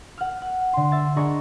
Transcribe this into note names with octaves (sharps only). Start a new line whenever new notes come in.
F#5 F6
F#6
D3 C6
E5 A6
D4 G#4 D#5 A#5 C#6